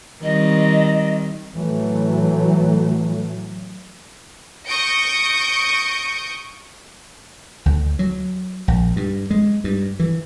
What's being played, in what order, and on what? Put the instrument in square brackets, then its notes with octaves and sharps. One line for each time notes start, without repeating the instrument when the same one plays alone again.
[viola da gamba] D#3 G3 C4 [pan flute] D#5
[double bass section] A2 E3 F#3 A3
[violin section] C#6 D#6 G6 A#6 C#7 D7
[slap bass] D2
F#3
A#1
G2
G#3
G2
E3